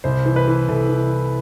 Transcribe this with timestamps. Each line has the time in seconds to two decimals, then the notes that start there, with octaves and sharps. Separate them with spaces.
0.04 C2 C5
0.26 E3
0.36 B4
0.48 E3
0.68 C2 A4
0.89 E3